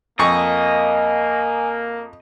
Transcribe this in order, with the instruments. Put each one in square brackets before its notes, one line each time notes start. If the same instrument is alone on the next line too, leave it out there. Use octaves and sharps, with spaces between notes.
[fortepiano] F2 C#6 [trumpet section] A#3 [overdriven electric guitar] D#5 [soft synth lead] G#5